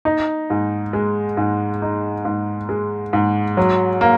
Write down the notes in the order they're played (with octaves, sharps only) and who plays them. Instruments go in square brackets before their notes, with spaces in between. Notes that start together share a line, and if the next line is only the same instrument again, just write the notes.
[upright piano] D#4
G#2
G#3
G#2
D#4
G#2
G#3
G#2
F#3
A#3